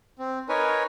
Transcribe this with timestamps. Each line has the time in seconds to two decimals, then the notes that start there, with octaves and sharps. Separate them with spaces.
0.19 C4
0.49 D#4 A#4 B4 C#5 G#5